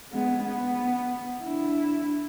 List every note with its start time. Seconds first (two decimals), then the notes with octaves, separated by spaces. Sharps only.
0.12 G#3 B3
0.43 B3
1.43 D4 E4